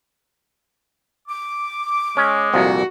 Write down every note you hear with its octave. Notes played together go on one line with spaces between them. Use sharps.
D6
G#3 C#4
C2 F2 A#2 F#4